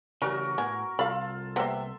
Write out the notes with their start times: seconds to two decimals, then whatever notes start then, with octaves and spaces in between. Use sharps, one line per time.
0.22 C#3 E3 G3 A3 C#4 F#4 A#4
0.58 A2 B3 G#5
0.99 C2 F4 A4 F5 B5
1.56 C3 A#3 B3 E5 C6